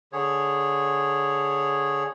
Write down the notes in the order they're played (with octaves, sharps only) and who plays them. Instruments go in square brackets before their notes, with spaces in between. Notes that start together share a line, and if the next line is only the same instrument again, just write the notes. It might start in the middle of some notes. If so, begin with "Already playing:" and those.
[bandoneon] D3 G#4 C#5